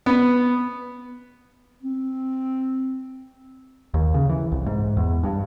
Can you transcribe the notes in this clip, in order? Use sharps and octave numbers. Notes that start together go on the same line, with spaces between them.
B3
C4
D#2
C#3
E3
C2
G#2
E2
G2